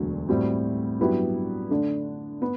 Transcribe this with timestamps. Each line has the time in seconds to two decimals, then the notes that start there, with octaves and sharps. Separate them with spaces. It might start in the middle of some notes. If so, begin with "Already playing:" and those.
Already playing: E1 D2 D3 F#3
0.28 A2 G3 C4 F#4
0.99 G2 F#3 B3 E4 G4
1.70 D3 A3 D4
2.42 B3